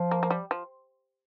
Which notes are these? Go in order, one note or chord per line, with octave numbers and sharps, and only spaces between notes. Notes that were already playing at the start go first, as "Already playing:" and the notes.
Already playing: F3
A#3
A#3
G3
F3